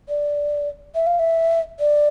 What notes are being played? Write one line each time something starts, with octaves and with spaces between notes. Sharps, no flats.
D5
E5
F5
E5
D5